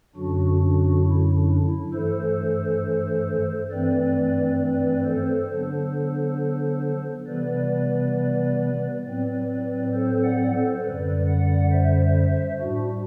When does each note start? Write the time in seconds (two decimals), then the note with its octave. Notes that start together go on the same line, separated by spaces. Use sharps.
0.16 F#2 D3 F#3 D4 F#4
0.61 D4 F#4
1.05 E4
1.35 D4
1.64 E4
1.94 G2 E3 A3 A4 C5
3.71 G2 E3 A3 C4 B4 D5
4.60 B4 D5
5.05 A4 C5
5.49 D3 F#3 B3 D4
7.27 C3 E3 G3 B3 B4 D5
9.05 A2 F#3 C4 B4 D5
9.94 A4 C5
10.23 D5 F#5
10.53 A4 C5
10.83 F#2 D3 G3 B4 D5
11.27 D5 F#5
11.71 C5 E5
12.60 A2 G3 D4 F#4